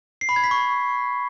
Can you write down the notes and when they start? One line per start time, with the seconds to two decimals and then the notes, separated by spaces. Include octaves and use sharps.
0.21 C7
0.29 B5
0.36 G#6
0.44 B6
0.51 C#6